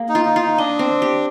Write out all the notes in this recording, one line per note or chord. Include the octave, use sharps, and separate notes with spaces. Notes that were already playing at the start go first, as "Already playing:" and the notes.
Already playing: A#3 G#4
D#4
F4
D#4
F4
D#4
D4 D#5
C4
G4